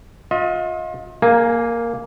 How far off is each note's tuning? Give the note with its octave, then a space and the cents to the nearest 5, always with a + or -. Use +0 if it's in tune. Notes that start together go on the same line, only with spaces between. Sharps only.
F4 +35 D#5 +40
A#3 +0 G#4 +45 G#5 +0